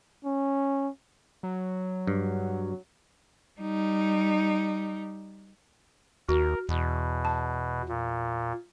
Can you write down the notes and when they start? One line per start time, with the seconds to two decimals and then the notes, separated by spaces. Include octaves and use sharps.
0.25 C#4
1.43 F#3
2.07 G2
3.60 G3 D#4
6.29 D#2 F#4 A#4
6.69 E2 B2
7.25 A5
7.89 A#2